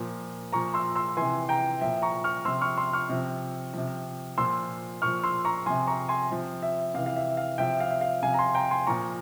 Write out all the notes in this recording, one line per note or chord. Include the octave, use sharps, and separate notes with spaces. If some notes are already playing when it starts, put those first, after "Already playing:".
Already playing: A#2 F3
A#2 F3 A#5 C#6
C6 E6
C6 E6
C3 E3 G#5 C6
G5 A#5
A#2 F3 E5 G5
A#5 C#6
C#6 F6
C3 F3 C6 E6
C#6 F6
C6 E6
C#6 F6
C3 F3
C3 F3
A#2 F3 C6 E6
A#2 F3 C#6 F6
C6 E6
A#5 C#6
C3 F3 G#5 C6
A#5 C#6
G#5 C6
C3 F3
E5
C3 E3 F5
F5
E5
F5
C3 F3 E5 G5
F5
E5
F5
C3 F3 F5 G#5
A#5
G#5 C6
G5 A#5
G#5 C6
A#2 F3 A#5 C#6